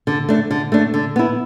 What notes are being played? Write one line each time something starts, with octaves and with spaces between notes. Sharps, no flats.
D3
A3 D4
D3
A3 D4
D3
B3 E4